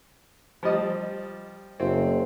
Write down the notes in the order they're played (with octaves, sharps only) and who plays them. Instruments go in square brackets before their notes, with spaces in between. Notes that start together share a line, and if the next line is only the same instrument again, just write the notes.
[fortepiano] F3 G3 D#5
[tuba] F#1 [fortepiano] C4